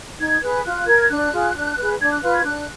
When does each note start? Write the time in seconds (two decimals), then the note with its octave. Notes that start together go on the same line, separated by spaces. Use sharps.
0.19 D#4 G#6
0.42 G#4 B4 F#6
0.65 F4 F#6
0.87 A#4 G#6
1.10 D4 F#6
1.32 F4 G#4
1.54 D4
1.77 G#4 B4
1.99 D4 G#6
2.10 F#6
2.22 F4 B4 F#6
2.34 G#6
2.44 D4 F#6